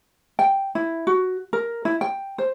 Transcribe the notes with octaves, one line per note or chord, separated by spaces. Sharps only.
G5
E4
F#4
A#4
E4
G5
C5